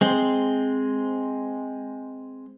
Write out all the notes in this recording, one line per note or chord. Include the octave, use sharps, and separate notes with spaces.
G#3 C4